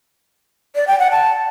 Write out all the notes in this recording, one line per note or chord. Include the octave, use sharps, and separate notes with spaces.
D5
G5
F#5
A5